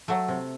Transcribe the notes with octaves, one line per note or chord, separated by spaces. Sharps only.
F#3 A3
C3